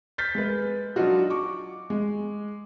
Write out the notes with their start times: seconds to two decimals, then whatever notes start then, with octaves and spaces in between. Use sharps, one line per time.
0.18 F6 G6 A6 B6
0.35 G#3 B4
0.96 F#3 D4 D#4 F4 F#4
1.30 C#6 D6
1.90 G#3